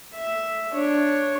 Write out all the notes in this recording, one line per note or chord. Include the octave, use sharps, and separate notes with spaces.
E5
D4 C#5